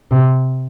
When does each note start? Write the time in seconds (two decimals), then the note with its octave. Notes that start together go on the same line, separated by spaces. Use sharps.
0.11 C3